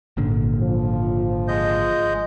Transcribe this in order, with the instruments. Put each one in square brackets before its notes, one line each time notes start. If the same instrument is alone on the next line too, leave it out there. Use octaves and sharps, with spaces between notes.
[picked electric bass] G#1 A#2 D3
[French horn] F3
[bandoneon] G#3 D#5 G6